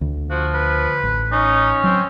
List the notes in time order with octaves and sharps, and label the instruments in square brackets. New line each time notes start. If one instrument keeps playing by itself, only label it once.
[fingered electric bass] D2
[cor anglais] F3 [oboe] F#4
[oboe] B4
[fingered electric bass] A1
[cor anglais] C#4 [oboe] D#4
[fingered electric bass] F#3 [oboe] C4